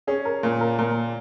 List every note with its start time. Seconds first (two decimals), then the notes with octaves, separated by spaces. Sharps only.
0.07 C#4 G#4
0.25 A#4
0.43 A#2 A#4
0.61 A#4
0.78 A#2 A#4